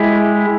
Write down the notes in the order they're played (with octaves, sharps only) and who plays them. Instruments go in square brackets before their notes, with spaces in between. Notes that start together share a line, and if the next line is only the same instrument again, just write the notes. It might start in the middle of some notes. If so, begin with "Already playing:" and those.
Already playing: [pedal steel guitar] G#3 E4 G4